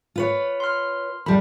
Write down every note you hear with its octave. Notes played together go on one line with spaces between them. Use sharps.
F4 B4 C#5
C6 F6
F2 G3 B5